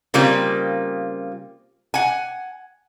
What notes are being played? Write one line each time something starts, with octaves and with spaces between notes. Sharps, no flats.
C#3 G3 A#3 C4 F4
F#5 G#5